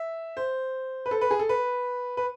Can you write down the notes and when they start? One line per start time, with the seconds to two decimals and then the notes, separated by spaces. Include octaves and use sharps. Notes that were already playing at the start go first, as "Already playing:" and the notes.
Already playing: E5
0.37 C5
1.06 B4
1.11 A4
1.21 B4
1.31 G#4
1.39 A4
1.49 B4
2.17 B4